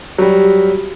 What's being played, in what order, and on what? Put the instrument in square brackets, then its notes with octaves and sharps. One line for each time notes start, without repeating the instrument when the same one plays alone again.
[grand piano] F#3 G3